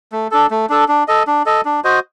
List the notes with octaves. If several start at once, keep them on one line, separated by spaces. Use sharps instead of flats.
A3
D4 A4
A3
D4 A4
D4
A4 D#5
D4
A4 D#5
D4
F#4 C5 D#5